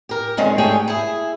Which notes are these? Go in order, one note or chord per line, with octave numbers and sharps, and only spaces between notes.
G4 A#4
D3 D#3 G#3 C4 C#4
G#2 A3 G4 G#4 C#5 G5
E4 G#4